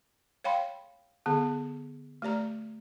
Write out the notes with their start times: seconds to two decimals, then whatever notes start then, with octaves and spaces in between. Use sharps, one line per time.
0.44 C#5 F5 G5 B5 C6
1.26 D3 B3 G#4
2.22 A3 G4 D5 A#5